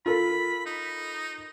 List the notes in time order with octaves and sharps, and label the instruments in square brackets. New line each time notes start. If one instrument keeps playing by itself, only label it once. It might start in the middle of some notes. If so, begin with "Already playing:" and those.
[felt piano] F4 A4 A#4 [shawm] B5
[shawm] D#4